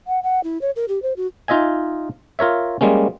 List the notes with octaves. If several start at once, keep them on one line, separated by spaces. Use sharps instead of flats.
F#5
F#5
E4
C#5
A#4
G4
C5
F#4
D#4 F4 D#5 E5 G#5
F4 A#4 C#5 E5
G3 G#3 A#3 C#4